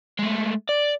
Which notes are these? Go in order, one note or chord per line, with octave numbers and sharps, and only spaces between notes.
G#3 A3
D5